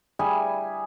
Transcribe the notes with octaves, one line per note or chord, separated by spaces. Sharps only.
G3 E4 G#4 G#5